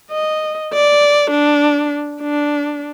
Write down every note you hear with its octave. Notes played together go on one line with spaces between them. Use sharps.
D#5
D5
D4
D4